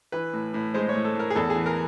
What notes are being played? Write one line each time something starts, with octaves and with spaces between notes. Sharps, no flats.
E3 B4
A2
A2
G#3 C5
A2 C#5
A4
A2 A#4
G#4
E2 A4
G#4
E3
A#4